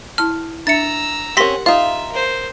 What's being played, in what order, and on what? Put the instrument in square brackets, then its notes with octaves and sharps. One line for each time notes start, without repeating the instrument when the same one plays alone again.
[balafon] E4 A5 [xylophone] F6
[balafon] D4 E5 [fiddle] A#5 E6 [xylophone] A6 C#7
[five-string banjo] C4 C#4 [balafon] G4 A#4 [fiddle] F#5 [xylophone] C6 A#6 B6
[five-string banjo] D#4 F4 [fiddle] E5 [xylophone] F5
[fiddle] A#4 C5